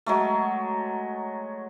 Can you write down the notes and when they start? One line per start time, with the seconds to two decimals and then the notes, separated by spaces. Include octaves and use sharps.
0.06 F#3 G#3 A3